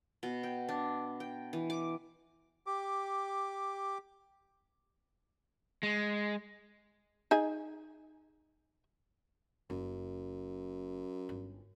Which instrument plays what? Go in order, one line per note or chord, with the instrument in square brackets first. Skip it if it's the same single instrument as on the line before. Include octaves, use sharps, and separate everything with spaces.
[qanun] B2
G5
D4
G5
E3
D6
[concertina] G4 D6
[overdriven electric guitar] G#3
[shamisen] D#4 G#4 G#5
[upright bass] F#1 [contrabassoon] F#2
[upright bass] G1